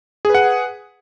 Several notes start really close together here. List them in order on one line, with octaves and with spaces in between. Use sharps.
G#4 B4 F#5